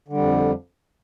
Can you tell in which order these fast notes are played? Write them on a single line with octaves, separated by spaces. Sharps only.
D3 G3 F2